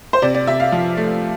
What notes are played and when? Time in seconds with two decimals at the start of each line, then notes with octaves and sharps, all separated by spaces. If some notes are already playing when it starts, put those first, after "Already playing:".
0.13 C5
0.22 C3 D5
0.35 D5
0.47 C3 E5
0.60 F5
0.72 F3
0.97 A3